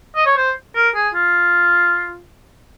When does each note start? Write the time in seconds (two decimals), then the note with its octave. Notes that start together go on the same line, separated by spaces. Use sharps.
0.15 D#5
0.26 C#5
0.37 C5
0.75 A#4
0.95 G#4
1.13 F4